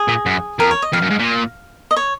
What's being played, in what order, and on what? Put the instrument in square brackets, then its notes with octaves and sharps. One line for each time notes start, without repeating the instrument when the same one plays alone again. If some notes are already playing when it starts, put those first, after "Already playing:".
Already playing: [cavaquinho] G#4
[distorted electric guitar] A#2
F#2
[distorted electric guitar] F2 [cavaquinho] A#4
[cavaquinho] C#5
D#5
[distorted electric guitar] F2 [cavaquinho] F5
[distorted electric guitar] F#2
G#2
A#2
[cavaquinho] D#5
C#5